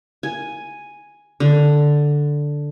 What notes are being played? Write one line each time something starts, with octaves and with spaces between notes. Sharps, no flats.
G#5
D3